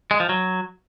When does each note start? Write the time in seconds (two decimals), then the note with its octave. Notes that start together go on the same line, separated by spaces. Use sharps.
0.11 G#3
0.20 F3
0.29 F#3